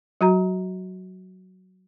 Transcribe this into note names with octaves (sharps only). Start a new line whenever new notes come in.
F#3 F#4 A#5